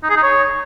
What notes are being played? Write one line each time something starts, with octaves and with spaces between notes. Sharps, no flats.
D#4
G#4
D#4
C#5